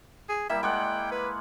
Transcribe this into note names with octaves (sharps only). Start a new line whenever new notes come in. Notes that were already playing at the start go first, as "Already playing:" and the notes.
G#4
G3 A#3 E4 E5
G#3 D5 F#5 G5
B4